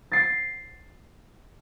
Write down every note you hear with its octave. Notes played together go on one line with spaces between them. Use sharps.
A6 C7